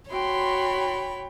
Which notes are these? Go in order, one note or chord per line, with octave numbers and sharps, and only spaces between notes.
F#4 C#5 G5 B5 C6